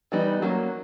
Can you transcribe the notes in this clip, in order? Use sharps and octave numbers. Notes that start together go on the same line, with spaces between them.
E3 G3 B3 D#4
F#3 A#3 C#4